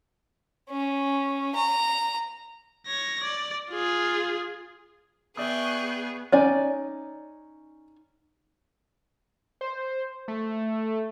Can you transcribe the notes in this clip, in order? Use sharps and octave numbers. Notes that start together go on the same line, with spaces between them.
C#4
A#5
C#5 A#6
D5
F4 G#4
B3 G#4 D5 E5 G5 C#6 D#6 F#6
C#4 D#4 D5 G#5
C5
A3